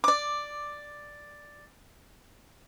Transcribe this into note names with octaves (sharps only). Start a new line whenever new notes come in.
D5 D6